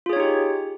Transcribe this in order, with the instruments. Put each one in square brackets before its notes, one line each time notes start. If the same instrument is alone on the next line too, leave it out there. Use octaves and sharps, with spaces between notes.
[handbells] F4
G#4
C#5
D#4
G4